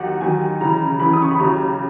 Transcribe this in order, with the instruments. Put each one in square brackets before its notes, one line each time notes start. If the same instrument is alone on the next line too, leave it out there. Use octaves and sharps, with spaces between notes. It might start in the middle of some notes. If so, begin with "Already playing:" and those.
Already playing: [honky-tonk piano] D#2 D#3 F#3 F#5
D#2 D#3 F#3 G#5
C#2 C#3 E3 A#5
C#2 C#3 E3 B5
D#6
C#6
B5
D#2 C#3 F#3 A#5